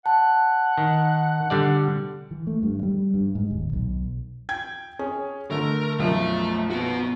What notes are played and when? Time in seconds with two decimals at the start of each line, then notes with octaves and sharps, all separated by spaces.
0.06 F#5 A5
0.78 D#3
1.50 D3 G3 D5
2.31 E3
2.47 A3
2.63 G2
2.83 G3
3.14 G2
3.35 G#2
3.50 D#1
3.73 B1
4.49 G5 G#6
4.99 C#4 G#4
5.51 D3 A3 A#4
5.99 B1 F#2 F3 A3 E5
6.70 B3 F#4